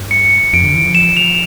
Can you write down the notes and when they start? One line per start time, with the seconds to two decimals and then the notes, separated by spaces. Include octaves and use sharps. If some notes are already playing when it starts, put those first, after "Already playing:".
Already playing: G2
0.11 C#7
0.53 F2 D7
0.64 D3
0.75 E3
0.85 F3
0.95 E7
1.17 F7